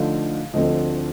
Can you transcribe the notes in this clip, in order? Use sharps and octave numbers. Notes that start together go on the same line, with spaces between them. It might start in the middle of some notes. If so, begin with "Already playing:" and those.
Already playing: D3 F3 A3 D#4 F5
D2 D3 F3 A3 C4 D#5